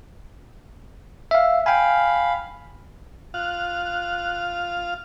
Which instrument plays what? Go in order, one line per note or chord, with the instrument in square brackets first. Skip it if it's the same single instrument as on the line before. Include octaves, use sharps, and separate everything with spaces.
[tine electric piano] E5 F5
[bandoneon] F5 B5 [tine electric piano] G5 G#5
[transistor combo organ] F4 F5 [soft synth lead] F#6